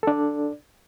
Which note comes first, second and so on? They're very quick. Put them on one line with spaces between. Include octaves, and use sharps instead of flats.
A4 D4 D5